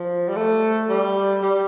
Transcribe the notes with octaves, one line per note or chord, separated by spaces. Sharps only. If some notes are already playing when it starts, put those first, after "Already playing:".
Already playing: F3
G3
A3
G3
G3